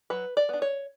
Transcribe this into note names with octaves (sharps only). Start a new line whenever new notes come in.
F#3 B4
D5
B3 D4
C#5